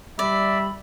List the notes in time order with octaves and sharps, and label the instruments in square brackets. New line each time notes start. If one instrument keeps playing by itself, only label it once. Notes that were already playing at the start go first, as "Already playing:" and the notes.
[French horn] G3 [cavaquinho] D5 [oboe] E5 [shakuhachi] B5